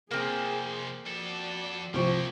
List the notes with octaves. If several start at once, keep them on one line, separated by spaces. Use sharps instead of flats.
C3 F3 A#3 C4 G#4
F2 F#4 A4 D5
C2 F3 A#3 G4 C#6